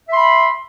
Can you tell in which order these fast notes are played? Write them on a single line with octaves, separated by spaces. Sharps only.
E5 C6 B5